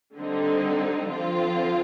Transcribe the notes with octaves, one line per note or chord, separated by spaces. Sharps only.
D3 G3 C4 D#4
D3 F3 C4 F4